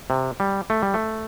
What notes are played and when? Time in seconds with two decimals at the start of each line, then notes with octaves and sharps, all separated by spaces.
0.10 C3
0.40 G3
0.70 A3
0.83 G3
0.94 A3